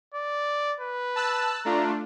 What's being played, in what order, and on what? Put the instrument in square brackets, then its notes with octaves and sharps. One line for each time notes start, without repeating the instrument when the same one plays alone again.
[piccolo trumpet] D5
B4
[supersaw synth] A5 E6 F#6
[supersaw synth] A3 D4 F4 [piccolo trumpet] A#5